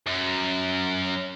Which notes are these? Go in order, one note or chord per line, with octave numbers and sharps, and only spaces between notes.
F#2